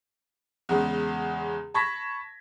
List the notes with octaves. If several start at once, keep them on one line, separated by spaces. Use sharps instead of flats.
E2 C#3 G#3
A5 B5 C#6 G#6 A#6 B6